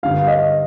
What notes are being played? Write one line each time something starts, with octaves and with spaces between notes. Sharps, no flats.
G2 D3 G3 F5
D#5